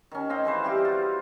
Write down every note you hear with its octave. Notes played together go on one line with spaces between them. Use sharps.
D#3 C#4
C4 D#5 F5
E3 G#4 B4 C5
G3 C4 G4 F5
F4 F#4